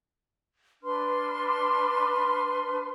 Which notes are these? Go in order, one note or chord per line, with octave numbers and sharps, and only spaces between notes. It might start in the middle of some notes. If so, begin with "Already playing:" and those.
D4 B4 C6 F6